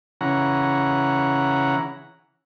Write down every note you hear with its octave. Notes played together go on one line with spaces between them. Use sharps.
C#3 E3 F#5 A#5